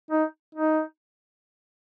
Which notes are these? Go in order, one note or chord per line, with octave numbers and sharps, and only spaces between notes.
D#4
D#4